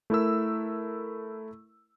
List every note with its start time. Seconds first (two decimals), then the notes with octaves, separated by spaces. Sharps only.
0.10 A3 E4 A#4 E6